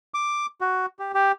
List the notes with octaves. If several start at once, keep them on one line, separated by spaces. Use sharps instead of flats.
D6
F#4
G4
G4